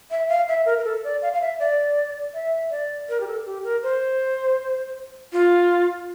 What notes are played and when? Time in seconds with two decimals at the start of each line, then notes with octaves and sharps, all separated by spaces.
0.11 E5
0.29 F5
0.48 E5
0.66 A#4
0.78 A#4
0.85 A4
1.04 D5
1.22 F5
1.33 F5
1.41 E5
1.59 D5
2.34 E5
2.71 D5
3.09 A#4
3.20 G4
3.27 A4
3.45 G4
3.64 A#4
3.83 C5
5.33 F4